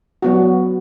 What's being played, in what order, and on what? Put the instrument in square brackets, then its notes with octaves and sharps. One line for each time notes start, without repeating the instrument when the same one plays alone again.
[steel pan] F#3 B3 F#4